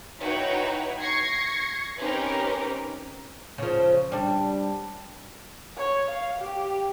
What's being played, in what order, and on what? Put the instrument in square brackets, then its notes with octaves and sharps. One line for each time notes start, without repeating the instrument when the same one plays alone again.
[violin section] D#4 E4 F#4 B4 C#5 G5
C#6 G#6 A#6 C7 C#7
C4 C#4 D#4 G4 A#4 B4
[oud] C#3 F3
G3 D4
[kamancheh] C#5
F5
G4